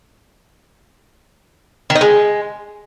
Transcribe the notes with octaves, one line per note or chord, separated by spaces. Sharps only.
D#3
D#4
G#3